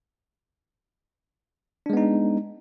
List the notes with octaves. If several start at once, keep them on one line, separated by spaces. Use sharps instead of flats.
G#3 B3 D4 D#4